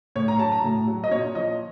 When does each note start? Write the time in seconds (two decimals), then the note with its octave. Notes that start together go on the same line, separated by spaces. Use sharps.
0.16 A2 C#5
0.28 A#5
0.39 F#3 A5
0.52 A#5
0.64 A2
0.87 F#3
1.04 D#5
1.11 A#2 C#5
1.35 F3 D#5